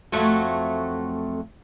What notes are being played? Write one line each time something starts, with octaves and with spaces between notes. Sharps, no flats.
F2 F#3 A3